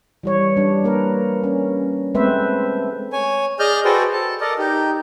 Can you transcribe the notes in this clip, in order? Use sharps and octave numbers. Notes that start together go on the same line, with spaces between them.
E3 G3 C#5
G3 D4
A#3 A#4 B4
C#4
G#3 A3 C4 B4 C5 E5
C#5 G#5
G#4 D5 D#5 F6 G6
F#4 G#4 A4 B4 C5 G5
A4 A5
A4 A#4 D5 D#5
D#4 G4